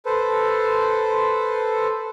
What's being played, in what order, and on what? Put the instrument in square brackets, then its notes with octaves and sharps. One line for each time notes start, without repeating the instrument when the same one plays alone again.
[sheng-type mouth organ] A4 B4 C5